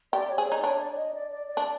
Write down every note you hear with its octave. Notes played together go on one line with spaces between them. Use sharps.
G4 D5
C#5
G#4 C5
D#4 C#5
D5
D4 C#5
D5
D5
D#5
D5
D5
D5
D4